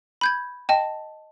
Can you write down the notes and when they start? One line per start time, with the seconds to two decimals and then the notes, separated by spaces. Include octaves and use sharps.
0.21 B5 G6 G#6
0.69 D#5 G5 A5